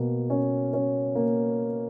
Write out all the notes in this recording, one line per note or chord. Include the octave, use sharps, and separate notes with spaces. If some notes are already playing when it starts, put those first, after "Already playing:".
Already playing: B2 A#3
C#4
C#4
A#3